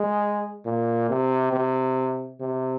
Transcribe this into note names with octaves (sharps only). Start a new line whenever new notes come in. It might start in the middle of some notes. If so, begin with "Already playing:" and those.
Already playing: G#3
A#2
C3
C3
C3